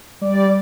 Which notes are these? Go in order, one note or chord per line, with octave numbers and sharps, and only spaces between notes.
G3 D5